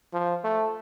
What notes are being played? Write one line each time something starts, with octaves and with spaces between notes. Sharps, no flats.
F3
A3